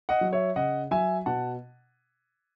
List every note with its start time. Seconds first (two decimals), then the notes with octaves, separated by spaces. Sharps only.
0.09 D#5 F#5
0.21 F#3
0.33 C#5 E5
0.56 C#3 D#5 F#5
0.91 F#3 E5 G#5
1.26 B2 F#5 A5